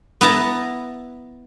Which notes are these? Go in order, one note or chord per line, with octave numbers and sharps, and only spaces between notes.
B3 E4 A5 A#5